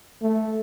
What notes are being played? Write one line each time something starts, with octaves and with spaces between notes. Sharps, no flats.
A3